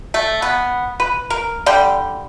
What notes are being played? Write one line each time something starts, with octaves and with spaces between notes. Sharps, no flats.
A3
B3
B4
A#4
D3 G3 G5